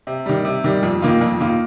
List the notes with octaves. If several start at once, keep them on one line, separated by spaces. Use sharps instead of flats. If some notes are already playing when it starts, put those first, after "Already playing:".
C3
D#3 G3
C3
D#3 G3
F2
D#3 A#3 F4
F2
D#3 A#3 F4